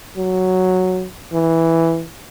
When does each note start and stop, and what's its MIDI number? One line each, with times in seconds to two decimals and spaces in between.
0.17 1.07 54
1.33 2.04 52